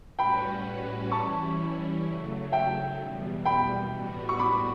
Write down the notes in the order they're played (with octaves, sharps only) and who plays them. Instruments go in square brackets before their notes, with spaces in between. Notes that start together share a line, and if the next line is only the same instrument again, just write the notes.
[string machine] A2 G3 C#4 F#4 B4 [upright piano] G5 B5
[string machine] E3 G3 C#4 E4 [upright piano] A5 C#6
[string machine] C#3 F#3 A3
[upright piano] E5 G5
[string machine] E2 B2 G3
[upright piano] G5 B5
[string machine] A2 G3 B3 F#4
[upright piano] C#6
B5 D6